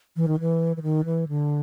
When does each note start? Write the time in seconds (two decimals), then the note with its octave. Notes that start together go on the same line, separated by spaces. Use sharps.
0.16 E3
0.28 D#3
0.40 E3
0.77 E3
0.83 D#3
1.05 E3
1.28 D3